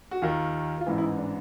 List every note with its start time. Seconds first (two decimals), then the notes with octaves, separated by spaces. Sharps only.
0.11 F#4
0.22 D#2 D#3 F4
0.81 F4
0.86 A1 G#2 E3 E4
0.98 E4
1.02 D#4
1.18 D4